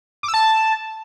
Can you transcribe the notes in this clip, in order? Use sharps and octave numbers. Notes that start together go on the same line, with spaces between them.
D6
E6
A5